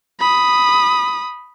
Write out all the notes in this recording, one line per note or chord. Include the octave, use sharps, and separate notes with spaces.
B5 D#6